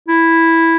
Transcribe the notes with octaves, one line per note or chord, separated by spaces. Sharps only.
E4